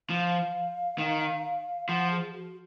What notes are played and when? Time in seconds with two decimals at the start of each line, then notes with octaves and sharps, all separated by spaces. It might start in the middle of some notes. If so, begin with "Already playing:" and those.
0.09 F3 F5
0.98 D#3
1.88 F3 F#5
2.10 G#4
2.33 F#4